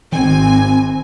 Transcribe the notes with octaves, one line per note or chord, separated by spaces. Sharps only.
G#1 D#3 C4 G#5